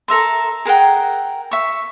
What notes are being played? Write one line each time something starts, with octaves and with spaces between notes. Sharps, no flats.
A4 A#4 E5 C6
G#4 A#4 F#5 G5
E5 C#6